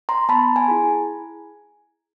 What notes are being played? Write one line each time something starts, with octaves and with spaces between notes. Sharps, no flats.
A#5 C6
B3 A5 B5
G#5 A#5
E4 G#4